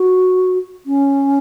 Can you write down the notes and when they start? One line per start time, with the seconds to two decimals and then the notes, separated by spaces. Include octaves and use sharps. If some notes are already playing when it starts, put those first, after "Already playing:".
Already playing: F#4
0.86 C#4